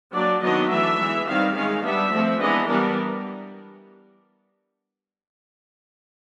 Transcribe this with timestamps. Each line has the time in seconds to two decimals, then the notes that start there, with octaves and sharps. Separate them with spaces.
0.14 F#3 A#3 D4 D5
0.42 D#3 F#3 B3 D4 D#5
0.70 E3 A3 D4 E5
0.99 E3 G#3 B3
1.27 D#3 G3 C4 F5
1.55 D#3 G#3 C#4 F5
1.83 G3 B3 D4 E5
2.11 F3 A3 C4
2.39 E3 G#3 B3 D4 D#5
2.68 E3 G3 B3 D4 A#4